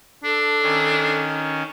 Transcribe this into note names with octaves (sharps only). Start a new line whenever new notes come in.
D4 A4
D#3 C#4